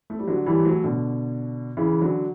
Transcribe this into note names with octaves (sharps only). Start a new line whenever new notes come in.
A3
G3
D3 F#3
E3 G3
F#3 A3
B2 D3
C#3 E3
D3 F#3